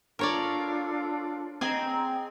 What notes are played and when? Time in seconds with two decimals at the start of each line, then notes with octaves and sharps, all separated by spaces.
0.19 D4 F4 A4 A#4 C#5 D5
1.61 C4 G#4 D#5 G#5 A#5